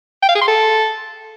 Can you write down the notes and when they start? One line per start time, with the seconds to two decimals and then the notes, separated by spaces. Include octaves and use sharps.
0.23 G5
0.29 F5
0.35 G#4
0.41 C6
0.48 A4